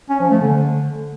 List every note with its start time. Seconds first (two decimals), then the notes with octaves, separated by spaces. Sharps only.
0.09 C#4
0.20 F3
0.31 A3
0.41 D3